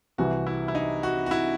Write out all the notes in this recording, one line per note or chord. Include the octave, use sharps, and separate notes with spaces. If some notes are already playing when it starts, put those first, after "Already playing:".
C2 C3 E3 F#4
E4
E4
D#4
F#4
F#4
E4